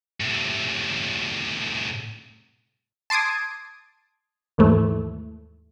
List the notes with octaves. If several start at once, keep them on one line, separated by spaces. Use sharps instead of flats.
A2 C3
A5 C6 D6 D#6 G#6
D#2 G#2 E3 A3